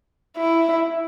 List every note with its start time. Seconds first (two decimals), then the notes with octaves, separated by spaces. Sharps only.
0.37 E4